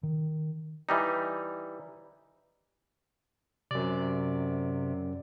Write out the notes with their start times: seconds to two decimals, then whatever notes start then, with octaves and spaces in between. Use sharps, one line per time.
0.03 D#3
0.89 E3 G3 D#4
3.71 F#2 C3 D5